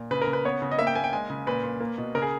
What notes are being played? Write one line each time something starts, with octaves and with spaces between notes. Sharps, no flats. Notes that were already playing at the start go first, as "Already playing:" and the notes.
Already playing: A#2
C#3 B4
A#4
C#3
B4
B3 C#5
C#3
D#5
A#3 E5
G5
A#3 G#5
G5
G#3 G#5
C#3
A#2 B4
A#2
A#3
B2
C#3 A#4
G#4